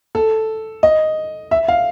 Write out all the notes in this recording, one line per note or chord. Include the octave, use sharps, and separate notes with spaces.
A4
D#5
E5
F5